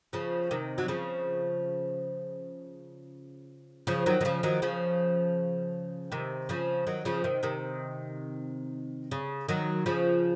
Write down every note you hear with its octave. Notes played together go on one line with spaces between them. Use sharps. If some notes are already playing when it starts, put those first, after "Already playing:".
C#3 F3
C3 D#3
F#3
C#3 F3
C#3 F3
D#3 F#3
D#3
C#3 F3
D#3 F#3
C#3 F3
C3 D#3
C#3 F3
D#3 F#3
C#3 F3
C3 D#3
C3 D#3
C#3
D#3 F#3
C#3 F3